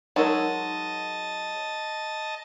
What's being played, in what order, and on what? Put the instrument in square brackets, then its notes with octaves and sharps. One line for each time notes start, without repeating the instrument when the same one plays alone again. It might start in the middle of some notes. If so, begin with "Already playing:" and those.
[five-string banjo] F#3 G#3 [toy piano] D#4 A#4 C#5 [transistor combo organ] D#5 A5